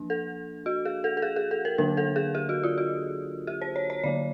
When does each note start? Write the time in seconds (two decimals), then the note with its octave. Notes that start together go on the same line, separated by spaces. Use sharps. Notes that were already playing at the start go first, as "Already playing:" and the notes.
Already playing: F3 A#3 D4
0.10 A4
0.66 F#4
0.85 G#4
1.04 A4
1.17 A4
1.22 G#4
1.36 G#4
1.51 A4
1.65 A#4
1.78 D3 F#3 A#3 D4 A#4
1.97 A4
2.16 G#4
2.35 G4
2.49 F#4
2.63 F4
2.78 F#4
3.47 G4
3.61 C5
3.76 C#5
3.90 C#5
4.04 D3 F#3 A#3 D5